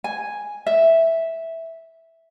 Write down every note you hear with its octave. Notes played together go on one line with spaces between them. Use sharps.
G#5
E5